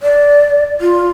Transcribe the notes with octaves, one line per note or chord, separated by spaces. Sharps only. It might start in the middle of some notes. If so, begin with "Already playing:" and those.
D5
F4